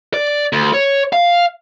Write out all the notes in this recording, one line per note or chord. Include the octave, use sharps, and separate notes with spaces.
D5
D2
C#5
F5